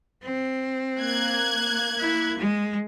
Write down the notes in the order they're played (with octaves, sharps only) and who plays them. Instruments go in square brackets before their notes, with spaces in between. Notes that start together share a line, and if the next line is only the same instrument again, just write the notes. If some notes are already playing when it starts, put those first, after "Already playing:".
[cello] C4
[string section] A#3 F#6 G#6
[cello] E4
G#3